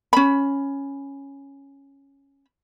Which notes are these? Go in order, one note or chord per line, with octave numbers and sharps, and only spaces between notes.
C#4 B5